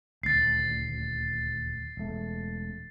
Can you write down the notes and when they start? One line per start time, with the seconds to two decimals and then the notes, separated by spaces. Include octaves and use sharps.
0.23 D#1 D2 A6 C7
1.97 E1 A3